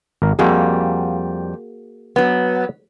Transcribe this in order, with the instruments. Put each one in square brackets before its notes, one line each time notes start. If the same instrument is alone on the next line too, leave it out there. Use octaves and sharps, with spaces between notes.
[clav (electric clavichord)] G#1 A#4
[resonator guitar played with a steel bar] F2 G3 [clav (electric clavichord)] A#3 F#4 G#4
[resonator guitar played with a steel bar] F#3 B3